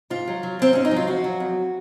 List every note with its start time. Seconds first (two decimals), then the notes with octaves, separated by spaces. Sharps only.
0.10 G#2 F4
0.27 F#3
0.43 F#3
0.59 F#3 C4
0.73 G#2 C#4
0.85 D#4
0.91 F#3
0.96 F4
1.08 F2 F#4
1.24 F#3
1.40 F2